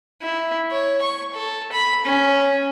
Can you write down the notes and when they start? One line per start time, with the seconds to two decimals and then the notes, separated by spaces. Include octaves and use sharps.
0.22 E4
0.71 C#5
1.02 C#6
1.34 A4
1.72 B5
2.05 C#4